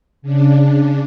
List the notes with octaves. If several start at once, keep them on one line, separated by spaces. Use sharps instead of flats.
C#3 D4